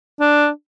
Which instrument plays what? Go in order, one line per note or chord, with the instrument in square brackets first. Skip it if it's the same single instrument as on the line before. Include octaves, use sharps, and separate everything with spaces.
[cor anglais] D4